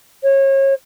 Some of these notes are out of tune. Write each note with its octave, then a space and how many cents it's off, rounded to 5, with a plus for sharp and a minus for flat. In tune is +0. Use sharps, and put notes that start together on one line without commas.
C#5 -30